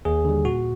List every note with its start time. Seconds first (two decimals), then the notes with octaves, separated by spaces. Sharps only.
0.05 D#2 G#4
0.25 D3 G3
0.45 A#2 F#4